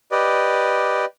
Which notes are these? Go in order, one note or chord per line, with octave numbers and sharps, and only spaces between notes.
G4 B4 D5 D#5